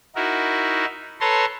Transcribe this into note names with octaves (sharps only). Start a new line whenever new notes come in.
D#4 E4 F#4 A#4
A4 B4 C#5 A5 A#5 C6